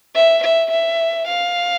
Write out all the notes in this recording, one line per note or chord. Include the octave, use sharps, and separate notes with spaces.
E5
E5
E5
F5